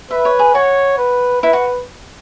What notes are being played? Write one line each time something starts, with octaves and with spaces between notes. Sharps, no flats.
B4 E5
C#5
G#4
F#4 C#5
B4
E4 B4
F#4